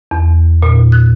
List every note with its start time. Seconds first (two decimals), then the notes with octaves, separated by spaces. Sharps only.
0.11 E2
0.63 A#2
0.92 F#6